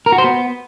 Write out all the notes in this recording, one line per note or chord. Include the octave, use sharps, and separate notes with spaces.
A#4
F#4
C5
B3